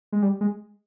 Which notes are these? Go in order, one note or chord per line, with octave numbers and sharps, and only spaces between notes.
G#3
G3
G#3